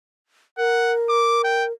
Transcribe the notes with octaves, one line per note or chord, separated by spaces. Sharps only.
A#4 F#5
D6
G5